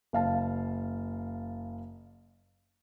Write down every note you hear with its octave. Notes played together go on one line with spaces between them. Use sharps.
F#1 F5 A5